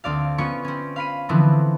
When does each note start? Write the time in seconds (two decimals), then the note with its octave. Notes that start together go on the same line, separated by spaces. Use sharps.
0.04 D2 C4 D5 F5
0.38 B3 C#4 F4 C#6 C#7 D7
0.64 C4 C#4
0.96 F5 B5 D#7
1.29 D3 E3 F3 B3 C4